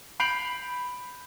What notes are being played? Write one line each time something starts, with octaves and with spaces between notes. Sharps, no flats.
B5 G6 C7 D7 F7 F#7